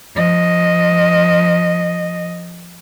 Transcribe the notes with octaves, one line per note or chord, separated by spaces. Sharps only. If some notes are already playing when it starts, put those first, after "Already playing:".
F3 D#5